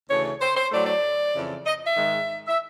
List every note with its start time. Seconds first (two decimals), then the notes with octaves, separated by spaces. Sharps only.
0.09 D2 C#3 E3 A3 C#5
0.25 C#5
0.41 C5
0.56 C5
0.71 A2 F#3 A3 D5
0.86 D5
1.33 F2 C#3 E3
1.65 D#5
1.85 E5
1.95 G#2 D#3 G#3
2.48 E5